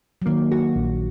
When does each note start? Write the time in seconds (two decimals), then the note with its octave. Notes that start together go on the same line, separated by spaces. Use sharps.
0.22 F#3
0.26 D#3 A#3
0.52 F#4
0.76 A#1